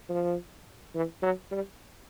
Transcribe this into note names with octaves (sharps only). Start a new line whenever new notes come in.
F3
E3
F#3
G3